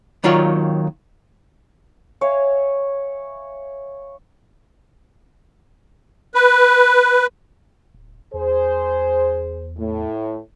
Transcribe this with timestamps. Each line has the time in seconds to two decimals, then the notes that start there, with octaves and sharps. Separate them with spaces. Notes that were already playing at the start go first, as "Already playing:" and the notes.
0.24 D#2 D#3 F#3 F4 C#5 D5
2.21 C#5 E5 F5 G#5
6.35 B4
7.94 D1
8.34 E2 G#4 C5
9.77 A2